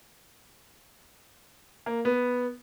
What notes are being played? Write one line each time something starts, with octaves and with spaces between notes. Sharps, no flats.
A#3
B3